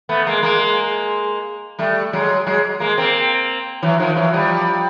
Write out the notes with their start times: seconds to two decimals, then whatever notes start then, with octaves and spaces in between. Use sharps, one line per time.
0.09 A3 B3
0.27 G#3 A#3
0.42 G#3 A#3
1.79 G3 A3
2.13 F#3 G#3
2.47 F#3 G#3
2.80 G#3 A#3
2.97 A#3 C4
3.82 E3 F#3
3.99 D#3 F3
4.16 E3 F#3
4.33 F3 G3